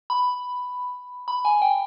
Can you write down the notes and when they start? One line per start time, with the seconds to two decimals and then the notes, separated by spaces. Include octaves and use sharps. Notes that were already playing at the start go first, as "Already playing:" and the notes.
0.10 B5
1.28 B5
1.45 G#5
1.62 G5